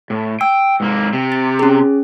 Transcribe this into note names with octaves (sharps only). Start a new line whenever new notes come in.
A2
G5 E6
G#2 A#3
C3
A6
C#4 G#4